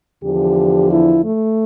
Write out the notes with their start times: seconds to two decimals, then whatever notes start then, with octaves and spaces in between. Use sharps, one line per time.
0.23 E2 D3 F3 G4
0.90 E4
1.23 A3